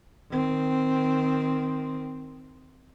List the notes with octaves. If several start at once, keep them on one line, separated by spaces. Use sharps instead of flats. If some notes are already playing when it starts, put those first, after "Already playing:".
D#3 C4